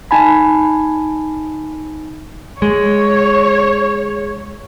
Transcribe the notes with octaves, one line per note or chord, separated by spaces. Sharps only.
D#4 G#5 A5 B5
G#3 C#5